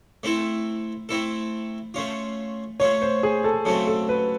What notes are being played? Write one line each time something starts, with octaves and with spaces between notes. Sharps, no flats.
A3 C4 E4 A4
A3 C4 E4 A4
A3 C#4 F4
A3 C#4 F4 C#5
C5
G#4
A4
C#3 F#3 A3 C4 A4
A4
B4